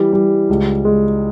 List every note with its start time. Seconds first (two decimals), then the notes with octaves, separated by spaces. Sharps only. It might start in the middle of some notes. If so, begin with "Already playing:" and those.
Already playing: E3 G3
0.13 G3
0.49 C#2
0.85 G#3